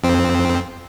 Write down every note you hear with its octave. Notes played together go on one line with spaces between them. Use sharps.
F2 C4